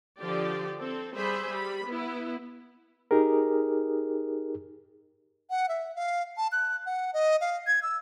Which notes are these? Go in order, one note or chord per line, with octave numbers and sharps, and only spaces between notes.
D3 F3 G4 D5
C4 A4
G3 G#4 C5 E5 B5
G3 B5
B3 E4
D#4 G4 G#4 A#4
F#5
E5
F5
A5
F#6
F#5
D#5
F5
G#6
E6